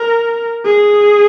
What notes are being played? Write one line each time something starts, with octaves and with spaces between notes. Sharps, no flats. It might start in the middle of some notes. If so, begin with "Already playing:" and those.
Already playing: A#4
G#4